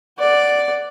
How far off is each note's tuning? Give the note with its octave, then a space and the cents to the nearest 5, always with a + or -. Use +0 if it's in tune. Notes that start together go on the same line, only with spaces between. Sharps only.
D5 +0 F#5 +0